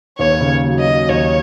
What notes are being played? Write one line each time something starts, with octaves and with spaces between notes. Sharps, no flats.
D#2 C#5
C#3
F#3
D#5
F#3
D#2 C#5